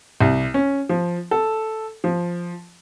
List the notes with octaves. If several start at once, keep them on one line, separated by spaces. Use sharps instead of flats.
C2
C#4
F3
A4
F3